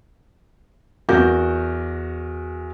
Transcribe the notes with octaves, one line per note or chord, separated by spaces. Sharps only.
E2 F#4 A#4 D6 G6